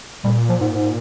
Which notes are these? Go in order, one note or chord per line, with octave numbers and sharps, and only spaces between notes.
A#2 G3
F3
G#2
G#2